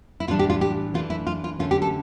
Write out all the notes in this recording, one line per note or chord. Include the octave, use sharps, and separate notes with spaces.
E4
A2 E3 G3 D4 F4
G4
F4
G4
E3 A3 D4 F4
E4
F4
F4
D3 A3 C#4 F4
G4
A4